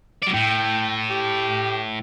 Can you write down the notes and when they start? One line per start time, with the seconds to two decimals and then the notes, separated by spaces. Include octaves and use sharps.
0.23 F#3 D5
0.34 A2 G5
1.10 G4